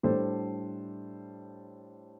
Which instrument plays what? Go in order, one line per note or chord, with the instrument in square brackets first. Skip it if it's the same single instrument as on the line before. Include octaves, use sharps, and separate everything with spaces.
[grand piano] A2 G3 D4 A4 C5